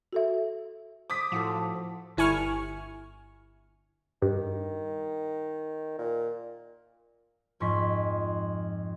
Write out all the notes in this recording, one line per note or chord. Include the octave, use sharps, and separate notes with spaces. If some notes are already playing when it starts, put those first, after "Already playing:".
F#4 A4 E5
D6 D#6 B6
A2 F3 F#4 A4
G1 E4 G#5 C#6 F6
G2 D#3
A#2
F2 G#2 C6 C#6 B6